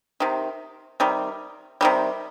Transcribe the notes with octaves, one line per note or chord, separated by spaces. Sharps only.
C3 D#3
C3 D#3 G3
C3 D#3 G3